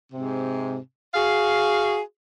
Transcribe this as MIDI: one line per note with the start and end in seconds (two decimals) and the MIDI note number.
0.13 0.77 44
0.13 0.77 48
1.15 2.00 66
1.15 2.00 68
1.15 2.00 77